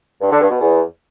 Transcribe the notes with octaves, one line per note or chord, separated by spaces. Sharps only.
G2
D3
G2
B2
E2